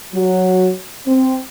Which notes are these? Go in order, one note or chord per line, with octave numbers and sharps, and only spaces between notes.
F#3
C4